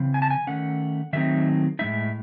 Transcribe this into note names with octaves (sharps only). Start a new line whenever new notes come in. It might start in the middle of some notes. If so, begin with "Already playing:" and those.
Already playing: C#3 E3 C4
G#5
A5
G#5
D#3 A3 C#4 F#5
D#3 F#3 A3 C4 D#4 E5
A2 G#3 D#4 E5